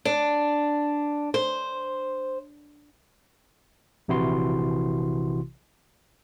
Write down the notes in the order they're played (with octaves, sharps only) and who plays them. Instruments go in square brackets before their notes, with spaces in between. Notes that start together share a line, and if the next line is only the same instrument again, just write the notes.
[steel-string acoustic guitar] D4
C5
[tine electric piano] A#1 C3 E3 E4 F#4 C6